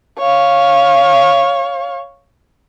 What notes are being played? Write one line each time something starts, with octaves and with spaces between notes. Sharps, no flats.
C#5 F5